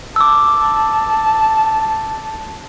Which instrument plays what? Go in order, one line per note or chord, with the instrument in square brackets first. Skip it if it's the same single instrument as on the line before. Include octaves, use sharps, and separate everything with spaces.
[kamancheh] A5 [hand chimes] D6 E6